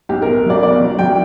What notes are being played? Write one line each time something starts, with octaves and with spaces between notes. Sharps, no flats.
B1 G4
A#4
B2
F#3 D5
B2 D5
F#3
F#3 G5